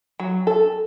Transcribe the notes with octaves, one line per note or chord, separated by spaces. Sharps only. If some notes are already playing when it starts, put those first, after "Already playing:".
F#3
A4